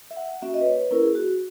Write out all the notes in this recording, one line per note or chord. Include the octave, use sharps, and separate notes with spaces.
E5
F#5
A#3 C#4 F#4 E5
D#5
B4
C#5
B4
A#3 C#4 E4 A#4
G#4
F#4